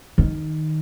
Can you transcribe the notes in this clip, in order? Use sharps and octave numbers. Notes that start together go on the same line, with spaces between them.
D#3